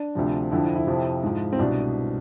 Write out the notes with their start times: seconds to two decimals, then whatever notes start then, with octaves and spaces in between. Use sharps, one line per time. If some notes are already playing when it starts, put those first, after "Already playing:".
Already playing: D4
0.15 D2 C3 F3
0.52 F2 D3 F3 E4
0.63 E4
0.75 E4
0.87 F2 C3 F3
1.24 G#2 F3
1.53 C4
1.59 C2 B2 D4